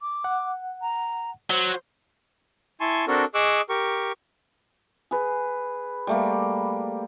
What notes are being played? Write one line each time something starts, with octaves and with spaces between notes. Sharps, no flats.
D6
F#5
A#5
F#3 C5
E4 G#5 A5 C6 C#6
C4 D4 F#4 A4 A#4
G#4 D#5 C#6 D6 E6 F#6
G4 A#4 C#6
G#4 B4
G3 A3 A#3